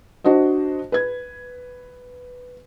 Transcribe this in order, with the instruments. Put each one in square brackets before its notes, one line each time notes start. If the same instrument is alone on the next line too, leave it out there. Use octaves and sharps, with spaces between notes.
[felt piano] D4 F#4 C5 D#5
B4 G#6